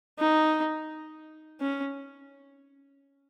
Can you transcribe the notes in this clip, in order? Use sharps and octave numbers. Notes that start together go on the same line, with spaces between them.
D#4
C#4